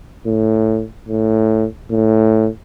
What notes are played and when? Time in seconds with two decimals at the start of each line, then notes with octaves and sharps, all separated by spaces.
0.26 A2
1.09 A2
1.91 A2